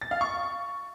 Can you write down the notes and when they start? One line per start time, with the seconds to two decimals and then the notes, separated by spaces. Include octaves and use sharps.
0.01 A6
0.11 F5
0.21 C#6